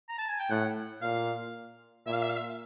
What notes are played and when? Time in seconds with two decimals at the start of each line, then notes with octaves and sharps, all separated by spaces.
0.09 A#5
0.18 A5
0.29 G#5
0.39 G5
0.50 A2 F#5
1.02 A#2 F5
2.06 A#2 E5
2.14 F5
2.22 E5
2.30 F5
2.37 E5